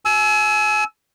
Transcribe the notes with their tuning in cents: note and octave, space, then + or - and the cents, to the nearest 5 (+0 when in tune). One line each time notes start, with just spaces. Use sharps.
G#5 +35 E6 +0